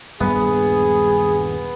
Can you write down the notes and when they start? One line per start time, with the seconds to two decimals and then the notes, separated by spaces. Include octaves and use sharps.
0.20 D#1 G2 F#3 B3 G#4